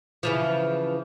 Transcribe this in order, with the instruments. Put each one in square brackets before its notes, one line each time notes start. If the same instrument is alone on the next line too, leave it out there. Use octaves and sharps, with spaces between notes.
[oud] C#3 E3 F3